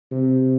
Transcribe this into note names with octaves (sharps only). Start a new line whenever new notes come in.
C3